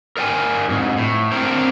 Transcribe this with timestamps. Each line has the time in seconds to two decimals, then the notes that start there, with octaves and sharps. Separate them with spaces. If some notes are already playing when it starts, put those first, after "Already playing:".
0.17 A#4 D5 G5 G#5
0.68 F2 G#2
0.97 A2
1.32 C4 D4 A#4 C5 G5